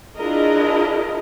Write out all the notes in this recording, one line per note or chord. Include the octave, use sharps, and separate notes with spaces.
D4 E4 F4 G#4 A#4 D#5